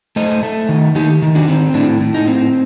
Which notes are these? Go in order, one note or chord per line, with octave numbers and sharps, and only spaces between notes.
A3 C5 D#5
A3
D#3
D#3 D#4 G4
D#3
D4 F#4
C4
A2 D4
A2
D#4
C4